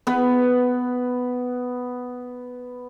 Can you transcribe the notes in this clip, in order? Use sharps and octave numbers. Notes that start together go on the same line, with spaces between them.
B3 B4